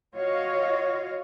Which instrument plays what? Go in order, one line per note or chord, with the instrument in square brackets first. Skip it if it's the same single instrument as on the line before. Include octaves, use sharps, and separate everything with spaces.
[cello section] F4 F#4 C#5 D#5 F5